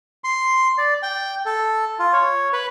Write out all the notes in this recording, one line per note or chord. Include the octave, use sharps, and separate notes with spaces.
C6
D5
G5
A4
F4
C#5
B4